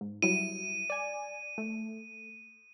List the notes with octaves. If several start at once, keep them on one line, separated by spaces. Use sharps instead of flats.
G#2
F#3 G3 E4 D#7
D5 G#5
A3